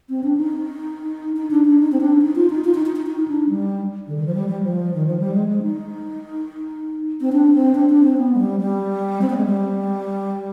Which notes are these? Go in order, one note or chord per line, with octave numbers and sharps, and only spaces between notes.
C4
D4
D#4
D#4
D4
D4
D#4
C4
D4
D#4
F4
D#4
F4
D#4
D#4
D#4
D#4
D4
G3
D3
D#3
F3
G3
G3
F3
D#3
F3
G3
G#3
G#3
D#4
C4
D4
C4
D4
D4
C4
B3
G#3
G3
G3
C4
B3
G#3
G3